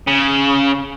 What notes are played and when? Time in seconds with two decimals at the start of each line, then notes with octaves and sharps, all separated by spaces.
0.07 C#3